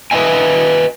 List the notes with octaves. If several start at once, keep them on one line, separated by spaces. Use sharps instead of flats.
B4 C5 D#5 E5 G#5